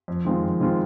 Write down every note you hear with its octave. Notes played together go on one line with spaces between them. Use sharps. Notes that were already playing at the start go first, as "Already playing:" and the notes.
F2
D#3 G#3 C4 F4
F2
D#3 G#3 C4 F4